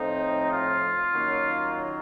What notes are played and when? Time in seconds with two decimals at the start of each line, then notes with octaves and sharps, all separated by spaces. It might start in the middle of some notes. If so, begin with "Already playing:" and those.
Already playing: A2 F3 C4 D#4
0.51 F4
1.13 D#3 F#3 A#3 C#4